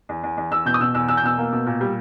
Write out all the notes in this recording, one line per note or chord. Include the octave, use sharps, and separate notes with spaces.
E2
E2
E2
E2 E6
B2 G6
D#6
B2 E6
E2 E6
E2 E6
G6
B2 E6
A#3
B2
A#2
G3